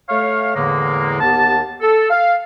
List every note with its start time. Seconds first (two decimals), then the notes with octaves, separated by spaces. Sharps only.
0.09 A3 C#5 F5
0.56 E2 A2 D3 G#3 A#3
1.21 D#2 B3 G4 A5
1.82 A4
2.10 F5